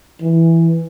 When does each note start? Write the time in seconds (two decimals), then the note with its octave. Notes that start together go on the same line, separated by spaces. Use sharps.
0.22 E3